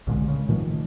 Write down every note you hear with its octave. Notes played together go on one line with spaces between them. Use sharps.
C2 A#2 D3 G#3
C#3
A#2 D#3 F3 A3